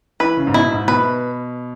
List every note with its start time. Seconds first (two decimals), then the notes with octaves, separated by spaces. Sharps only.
0.20 E3 B4
0.37 C#3
0.47 G#2
0.54 B2 E4
0.71 G#2
0.88 B2 B4